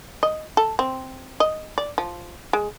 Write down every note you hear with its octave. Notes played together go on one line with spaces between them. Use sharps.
D#5
A4
C4
D#5
D5
F3
G#3